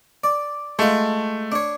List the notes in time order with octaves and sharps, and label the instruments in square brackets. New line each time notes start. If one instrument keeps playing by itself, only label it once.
[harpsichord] D5
[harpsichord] G#3 F4 [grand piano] A3
[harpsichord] D4 C#5